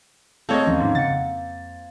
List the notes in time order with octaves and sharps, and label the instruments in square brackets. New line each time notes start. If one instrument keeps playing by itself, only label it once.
[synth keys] A3 G#4 F5 [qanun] A#3 C4 [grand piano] A4 C#5 D#5
[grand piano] E2 [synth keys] D#3 F3 C#4
[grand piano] G#2
[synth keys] C#3 F#5 C#7 [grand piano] A6
[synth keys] F2